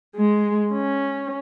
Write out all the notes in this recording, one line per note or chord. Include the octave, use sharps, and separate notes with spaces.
G#3
C#4